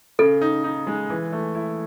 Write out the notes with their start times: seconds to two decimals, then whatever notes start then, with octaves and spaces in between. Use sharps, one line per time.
0.19 C#3 A4
0.41 D#4
0.64 D#4
0.87 G#3
1.10 E3
1.33 A3
1.55 E4